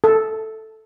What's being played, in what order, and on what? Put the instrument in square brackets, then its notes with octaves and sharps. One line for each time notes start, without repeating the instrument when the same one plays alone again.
[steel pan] A4